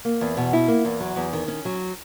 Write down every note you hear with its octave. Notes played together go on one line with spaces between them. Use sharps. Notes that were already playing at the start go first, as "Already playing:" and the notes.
A#3
E2
B2
E4
A#3
E2
F#3
E2
D#3
C#4
F#3